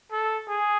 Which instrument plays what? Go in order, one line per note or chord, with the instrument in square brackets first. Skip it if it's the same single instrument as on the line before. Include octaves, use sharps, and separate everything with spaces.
[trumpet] A4
G#4